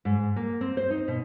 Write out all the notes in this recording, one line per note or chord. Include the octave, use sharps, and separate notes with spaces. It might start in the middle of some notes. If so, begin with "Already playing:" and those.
G#2
A#3
C4
C5
D#4
B2